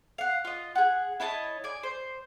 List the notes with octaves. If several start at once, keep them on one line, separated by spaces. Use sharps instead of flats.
F5 F#5
F4 D#5
G#4 F#5
E4 C#5 D#5 A5
D5 G#5
C5